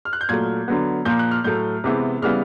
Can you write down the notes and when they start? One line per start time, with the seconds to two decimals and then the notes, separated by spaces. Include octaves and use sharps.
0.05 F6
0.13 F#6
0.21 G6
0.29 A#2 F#3 A3 G#6
0.68 D3 F#3 B3
1.05 A#2 F3 A#3 G6
1.19 F#6
1.31 F6
1.44 A2 F#3 A3 G6
1.84 C3 E3 G#3 B3
2.22 C#3 E3 G3 B3 F6